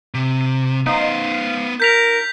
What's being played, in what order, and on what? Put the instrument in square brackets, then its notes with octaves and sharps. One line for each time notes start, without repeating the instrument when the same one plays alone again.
[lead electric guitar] C3
[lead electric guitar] B3 C5 [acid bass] D#4 [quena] F5
[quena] A#4 [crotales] G6 B6 F7